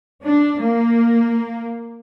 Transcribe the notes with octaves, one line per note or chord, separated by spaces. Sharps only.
D4
A#3